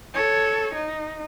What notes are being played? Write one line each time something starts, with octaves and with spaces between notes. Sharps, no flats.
A4 C#5
D#4